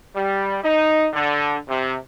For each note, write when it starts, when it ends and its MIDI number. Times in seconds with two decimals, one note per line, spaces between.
0.16 0.56 55
0.63 1.06 63
1.14 1.54 50
1.69 1.94 48